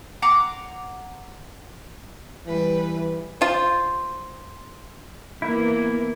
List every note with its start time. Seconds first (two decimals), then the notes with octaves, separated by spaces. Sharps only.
0.22 F#5 A#5 C6 D6
2.47 E3 G3 B4
3.41 F4 C5
5.42 E3 A#3 B3 E4